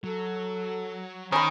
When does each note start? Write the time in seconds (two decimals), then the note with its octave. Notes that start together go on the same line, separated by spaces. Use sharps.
0.04 F#3 A4
1.32 D#3 C#4 G#5 B5